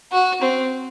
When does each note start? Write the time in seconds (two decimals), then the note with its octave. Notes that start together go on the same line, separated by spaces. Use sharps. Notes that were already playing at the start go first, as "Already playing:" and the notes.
0.12 F#4
0.42 C4